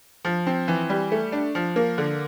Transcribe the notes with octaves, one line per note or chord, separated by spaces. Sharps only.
F3
C4
E3
G3
A3
D4
F3
A#3
D3